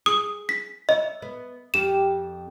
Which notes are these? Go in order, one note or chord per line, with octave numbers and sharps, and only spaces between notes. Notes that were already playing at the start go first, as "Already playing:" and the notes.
G#4 D#6
B6
C#5 D#5 E5
B3
F2 G4 E7